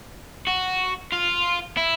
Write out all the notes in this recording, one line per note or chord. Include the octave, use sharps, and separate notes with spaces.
F#4
F4
E4